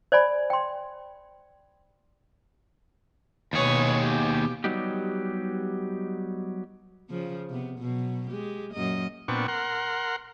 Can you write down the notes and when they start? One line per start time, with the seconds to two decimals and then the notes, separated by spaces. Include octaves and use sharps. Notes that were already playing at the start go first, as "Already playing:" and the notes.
0.12 C5 D5 G#5 B5
0.50 G5 C6
3.53 D#2 B2 G#4 B4 C#5
3.98 G4
4.64 F#3 G3 B3 D#4 F#4 G4
7.09 C#3 F3
7.50 C3 B3
7.79 B2 F#3
8.29 G#3 G4
8.72 F#2 A#2 D#5
9.28 A#2 B3 C4 D4 C#6
9.48 A#4 F#5 C6